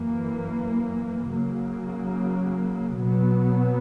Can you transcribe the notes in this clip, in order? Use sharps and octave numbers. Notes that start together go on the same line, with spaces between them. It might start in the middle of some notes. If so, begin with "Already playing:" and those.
Already playing: F#2 E3 A#3
C#3 F#3 A#3
B2 F#3 B3